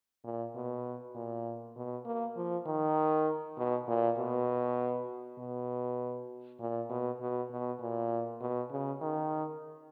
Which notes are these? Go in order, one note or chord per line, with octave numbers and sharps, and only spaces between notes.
A#2
B2
A#2
B2
A#3
F3
D#3
B2
A#2
B2
B2
A#2
B2
B2
B2
A#2
B2
C#3
D#3